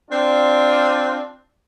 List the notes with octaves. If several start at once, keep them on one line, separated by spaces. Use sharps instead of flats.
C4 D4 F4